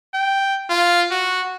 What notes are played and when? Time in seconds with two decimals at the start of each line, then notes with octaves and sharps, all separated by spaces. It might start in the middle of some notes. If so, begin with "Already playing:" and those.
0.14 G5
0.69 F4
1.11 F#4